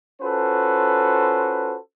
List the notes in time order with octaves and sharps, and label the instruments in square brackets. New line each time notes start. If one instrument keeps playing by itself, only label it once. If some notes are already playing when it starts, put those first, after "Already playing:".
[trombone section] C#4 F4 F#4 A4 B4 C5